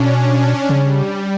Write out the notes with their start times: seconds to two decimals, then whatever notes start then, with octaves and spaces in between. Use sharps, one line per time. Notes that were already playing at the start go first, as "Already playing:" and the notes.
Already playing: B2 C#4 D4
0.69 C#3 G3